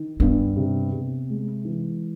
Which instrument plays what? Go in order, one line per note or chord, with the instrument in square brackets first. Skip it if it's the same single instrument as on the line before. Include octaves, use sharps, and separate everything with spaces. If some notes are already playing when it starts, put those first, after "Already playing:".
Already playing: [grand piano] D#3
[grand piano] G2 [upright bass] B3
[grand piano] C3
C3
G#3
E3